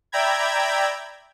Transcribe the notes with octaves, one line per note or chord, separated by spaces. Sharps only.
D5 E5 G5 A#5 B5 G#6